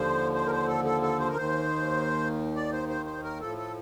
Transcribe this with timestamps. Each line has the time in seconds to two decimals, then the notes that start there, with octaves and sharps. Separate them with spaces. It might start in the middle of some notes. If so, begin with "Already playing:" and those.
Already playing: D#2 D3 F3 C5
0.34 C5
0.46 A#4
0.51 C5
0.68 A4
0.85 A4
1.02 A4
1.19 C5
1.29 A#4
1.36 D#2 D#3 C5
2.56 D5
2.72 C5
2.89 C5
3.06 C5
3.23 A#4
3.40 A2 F3 A4
3.57 A4